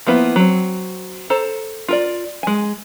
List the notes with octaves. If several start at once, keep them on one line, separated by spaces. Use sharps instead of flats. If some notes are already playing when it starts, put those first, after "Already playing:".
F3 A#3 B3 E4
F#3 C4
A4 C5 A#5
F4 A#4 D5
G#3 G#5